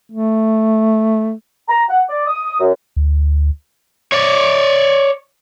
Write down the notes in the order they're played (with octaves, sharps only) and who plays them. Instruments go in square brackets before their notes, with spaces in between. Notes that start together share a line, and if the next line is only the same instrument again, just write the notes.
[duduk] A3
[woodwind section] A#5
F#5
D5
D#6
F#2
[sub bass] D2
[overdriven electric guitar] C#5 D5